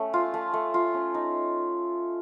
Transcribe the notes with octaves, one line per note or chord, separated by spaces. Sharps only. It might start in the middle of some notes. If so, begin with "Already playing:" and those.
Already playing: A3 C#4
F4
A3
A3
F4
C#4
D#4